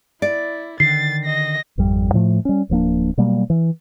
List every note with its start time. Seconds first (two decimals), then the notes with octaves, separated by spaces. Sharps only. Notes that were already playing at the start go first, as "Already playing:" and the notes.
0.22 E4 D5
0.80 D3 D#3 A6 C7
1.25 D#5 A#6
1.78 G#1 F2 G3
2.14 A2 F3 A3
2.45 G3 C#4
2.70 D1 F3 A#3 D4
3.18 B2 F#3 G3 A#3
3.50 E3